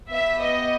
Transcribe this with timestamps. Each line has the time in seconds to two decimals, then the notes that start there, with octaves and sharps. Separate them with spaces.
0.11 B3 G4 E5
0.41 D#5